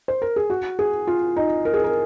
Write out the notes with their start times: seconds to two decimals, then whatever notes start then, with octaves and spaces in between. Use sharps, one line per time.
0.08 C5
0.22 A#4
0.36 G#4
0.50 F#4
0.79 G#4
1.07 F4
1.36 D#4
1.65 A#4
1.74 G#4
1.84 A#4